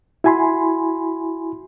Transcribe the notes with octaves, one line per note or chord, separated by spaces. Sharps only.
E4 F#4 G#5 B5 C6